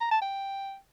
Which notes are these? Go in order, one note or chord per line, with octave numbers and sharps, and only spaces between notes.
A#5
A5
G5